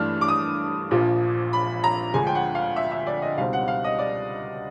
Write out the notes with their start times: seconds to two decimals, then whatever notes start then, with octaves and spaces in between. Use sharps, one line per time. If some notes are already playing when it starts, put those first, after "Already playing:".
Already playing: G2 E3 A3 D4 F6
0.21 D6
0.28 D#6
0.91 A#1 A#2 F3
1.53 B5
1.84 A#5
2.14 D2 D3 F3 G#3 G#5
2.27 G5
2.35 F#5
2.55 F5
2.76 E5
2.92 E5
3.07 D5
3.22 D#5
3.37 C#2 B2 G3 C4 D#4 F5
3.53 F#5
3.68 F5
3.84 D#5
3.99 D5